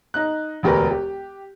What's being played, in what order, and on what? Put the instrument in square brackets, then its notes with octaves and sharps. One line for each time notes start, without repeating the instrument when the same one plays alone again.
[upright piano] D#4 F#6
E1 D2 G4 A#4 B4
G4